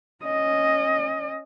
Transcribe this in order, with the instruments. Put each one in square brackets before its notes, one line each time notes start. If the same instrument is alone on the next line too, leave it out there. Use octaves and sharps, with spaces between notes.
[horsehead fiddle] C#4 D#5